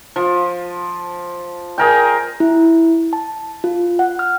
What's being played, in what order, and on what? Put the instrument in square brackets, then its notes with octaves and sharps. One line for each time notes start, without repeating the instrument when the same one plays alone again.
[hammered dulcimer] F3
G#4 A#4 G5
[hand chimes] E4
A5
F4
F#5
F6